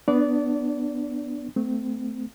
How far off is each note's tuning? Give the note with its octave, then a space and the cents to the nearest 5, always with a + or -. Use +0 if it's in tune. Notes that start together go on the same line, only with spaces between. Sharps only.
B3 +0 D4 +15 D5 -25
A3 +0 C4 -35